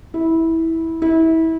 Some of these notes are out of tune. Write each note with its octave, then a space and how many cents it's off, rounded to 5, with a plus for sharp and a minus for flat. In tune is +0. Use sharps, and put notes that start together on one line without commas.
E4 -15
E4 -25